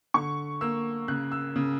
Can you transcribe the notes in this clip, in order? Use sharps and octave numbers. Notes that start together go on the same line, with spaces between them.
D3 C#6
A#3 E6
C#3 F#6
E6
C#3